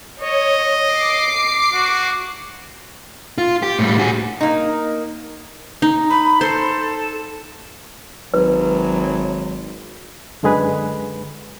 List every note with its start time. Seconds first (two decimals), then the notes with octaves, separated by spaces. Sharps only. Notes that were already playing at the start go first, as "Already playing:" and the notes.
0.21 C#5 D#5
0.92 D6 C7
1.73 F#4
3.38 F4
3.63 G4
3.79 A2 G3
3.99 F#4 G#4
4.41 A#3 D#4
5.82 D#4
6.10 B5
6.41 A4 C5
8.34 G#1 F#3 B4
10.43 F#2 D3 G#3 G#4 B4